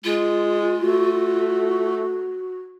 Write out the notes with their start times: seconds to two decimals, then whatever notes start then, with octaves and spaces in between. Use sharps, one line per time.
0.04 G#3 F4
0.79 A3 F#4